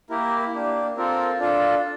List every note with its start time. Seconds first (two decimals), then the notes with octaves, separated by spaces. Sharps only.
0.10 A#3 E4 G4 A#4
0.53 A#3 D4 G4
0.97 C4 F4 A4 A#4
1.40 D4 F4 A4